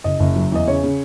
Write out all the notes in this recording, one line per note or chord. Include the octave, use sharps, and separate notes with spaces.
F#1 D#5
F#1
F#3
E2 D#5
C#3 C#5
C#3